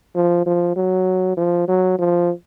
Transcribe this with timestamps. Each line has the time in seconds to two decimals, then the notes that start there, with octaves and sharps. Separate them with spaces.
0.15 F3
0.46 F3
0.76 F#3
1.37 F3
1.68 F#3
1.98 F3